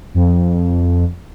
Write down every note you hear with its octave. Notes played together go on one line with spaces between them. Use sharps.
F2